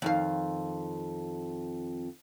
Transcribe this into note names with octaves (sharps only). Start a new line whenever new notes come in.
F2 D#3 F5